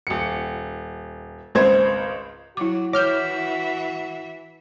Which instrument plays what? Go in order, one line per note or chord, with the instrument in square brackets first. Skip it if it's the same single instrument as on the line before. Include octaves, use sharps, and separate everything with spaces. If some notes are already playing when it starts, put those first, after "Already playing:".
[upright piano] D#1 C#7
G#1 C#2 C4 C5 G#6
[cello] F#3 [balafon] E4 D6 [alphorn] F#4
[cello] E3 E5 [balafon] C#5 [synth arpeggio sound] D6 F6 G6